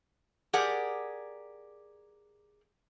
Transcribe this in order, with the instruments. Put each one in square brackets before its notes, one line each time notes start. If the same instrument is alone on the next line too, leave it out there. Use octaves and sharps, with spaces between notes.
[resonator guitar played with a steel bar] G4 G#4 A#4 D5 F#5